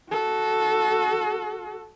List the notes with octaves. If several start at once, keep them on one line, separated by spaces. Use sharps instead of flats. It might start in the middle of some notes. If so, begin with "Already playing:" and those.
F#4 A4